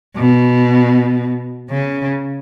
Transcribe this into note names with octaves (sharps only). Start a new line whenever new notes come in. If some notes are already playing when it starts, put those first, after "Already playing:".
B2
C#3